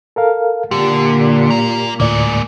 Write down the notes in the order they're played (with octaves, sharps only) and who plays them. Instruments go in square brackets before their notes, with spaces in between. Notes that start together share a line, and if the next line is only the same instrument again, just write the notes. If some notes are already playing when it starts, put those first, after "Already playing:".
[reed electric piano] A4 A#4 F5
[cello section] A#2 [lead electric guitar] D3 [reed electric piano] G4
[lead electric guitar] A#3 A#5
[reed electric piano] D2 A2 D5 [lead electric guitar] G#3 A#3